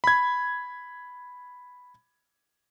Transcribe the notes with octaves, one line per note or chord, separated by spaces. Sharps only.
B5 G#6